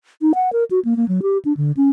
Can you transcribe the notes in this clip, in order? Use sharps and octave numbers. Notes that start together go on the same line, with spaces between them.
D#4
F#5
A#4
F#4
A#3
A#3
F#3
G4
D4
D3
C#4